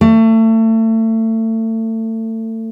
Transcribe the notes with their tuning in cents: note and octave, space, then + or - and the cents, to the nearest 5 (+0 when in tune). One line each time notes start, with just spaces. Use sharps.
A3 +30